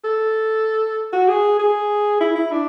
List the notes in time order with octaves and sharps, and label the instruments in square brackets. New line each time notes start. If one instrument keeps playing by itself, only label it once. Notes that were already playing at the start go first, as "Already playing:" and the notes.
[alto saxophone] A4
F#4
G#4
G#4
E4
E4
D4